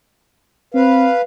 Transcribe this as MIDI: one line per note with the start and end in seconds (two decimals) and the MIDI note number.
0.74 1.08 60
0.74 1.21 71
0.74 1.21 77